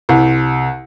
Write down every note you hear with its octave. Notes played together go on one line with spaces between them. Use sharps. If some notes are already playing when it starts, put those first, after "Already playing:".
C2